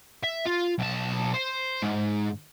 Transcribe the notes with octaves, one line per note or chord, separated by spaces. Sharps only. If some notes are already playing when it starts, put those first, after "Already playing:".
E5
F4
B1 A5
C5
G#2